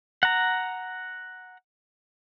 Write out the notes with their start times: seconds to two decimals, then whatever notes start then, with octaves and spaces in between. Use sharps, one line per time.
0.23 F#5 A#5